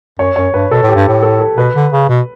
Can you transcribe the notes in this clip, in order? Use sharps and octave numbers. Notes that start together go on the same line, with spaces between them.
F#2 C#5
F#2 C#5
G2 B4
B2 A4
A2 G4
G2
A2
A4
A4
B2 B4
D3
C#3
B2